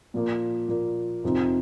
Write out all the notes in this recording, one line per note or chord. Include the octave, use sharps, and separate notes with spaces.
A#2 F3 A#3
A#2 F3 A#3
F2 C3 F3 C4 D#4